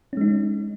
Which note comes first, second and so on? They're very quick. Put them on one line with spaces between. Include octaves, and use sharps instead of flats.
C#4 G#3 D#4